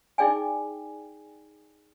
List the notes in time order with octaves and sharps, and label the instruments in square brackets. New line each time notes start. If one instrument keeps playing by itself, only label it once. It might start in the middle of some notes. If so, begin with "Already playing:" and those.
[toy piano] D#4 E4 G#4 D5 G5 G#5